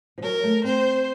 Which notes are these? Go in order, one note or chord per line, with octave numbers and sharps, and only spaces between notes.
F3
F#3 A#4
A3
C4 C5